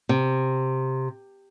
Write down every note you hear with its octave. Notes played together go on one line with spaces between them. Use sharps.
C3